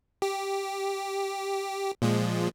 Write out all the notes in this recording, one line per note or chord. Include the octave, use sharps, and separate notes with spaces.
G4
A#2 F3 G#3